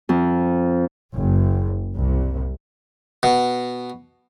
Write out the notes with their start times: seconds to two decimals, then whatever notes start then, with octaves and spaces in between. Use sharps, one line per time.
0.09 F2
1.13 F#1
1.96 C2
3.23 B2